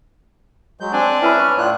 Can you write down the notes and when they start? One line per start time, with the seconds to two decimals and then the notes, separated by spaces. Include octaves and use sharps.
0.80 F#3 G#3 G6
0.93 C4 D4 G#5
1.22 C#4 E4 B4 E5 B5
1.39 A5 C#6 D6 F6
1.58 A2 F4 D5 F#6